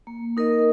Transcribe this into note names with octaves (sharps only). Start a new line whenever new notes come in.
A#3
D#4 A#4 D#5